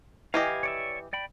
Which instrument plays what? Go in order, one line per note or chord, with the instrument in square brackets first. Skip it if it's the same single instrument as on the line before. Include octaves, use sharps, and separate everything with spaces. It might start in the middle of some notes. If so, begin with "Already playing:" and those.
[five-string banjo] E3 G4 D#5 [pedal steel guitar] F5 G#5
[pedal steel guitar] C#5 D5 E5
D5 G5 B5